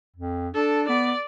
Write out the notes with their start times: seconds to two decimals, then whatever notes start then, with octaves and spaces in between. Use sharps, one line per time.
0.16 F2
0.54 D4 A4
0.89 B3 D5